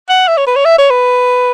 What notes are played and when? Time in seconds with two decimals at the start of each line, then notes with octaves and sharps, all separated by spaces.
0.09 F#5
0.28 E5
0.37 C#5
0.47 B4
0.56 C#5
0.65 E5
0.78 C#5
0.90 B4